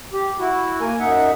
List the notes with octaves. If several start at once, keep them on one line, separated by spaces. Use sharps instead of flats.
G4
E4 F#4
A#3 A#4 G#5
F#2 D#4 E5 F#5